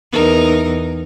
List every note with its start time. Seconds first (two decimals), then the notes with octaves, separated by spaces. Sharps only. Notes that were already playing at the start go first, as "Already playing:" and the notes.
0.13 E2 D#4 A#4